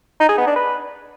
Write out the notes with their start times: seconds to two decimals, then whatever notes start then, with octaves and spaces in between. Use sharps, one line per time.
0.20 D#4
0.29 G#4
0.38 B3
0.47 D4
0.56 B4